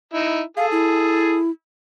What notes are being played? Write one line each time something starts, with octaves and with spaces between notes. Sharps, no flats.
D#4 E4
G#4 A4 F5
E4